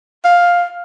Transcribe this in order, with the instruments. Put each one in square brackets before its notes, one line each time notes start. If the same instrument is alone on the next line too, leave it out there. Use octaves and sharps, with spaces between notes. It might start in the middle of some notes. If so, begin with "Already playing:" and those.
[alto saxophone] F5